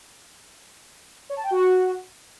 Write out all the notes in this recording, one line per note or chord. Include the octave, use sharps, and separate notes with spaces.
C#5
A5
G5
F#4